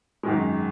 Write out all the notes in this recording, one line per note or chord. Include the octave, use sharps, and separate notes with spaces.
G#1 F#2 D#3 G#3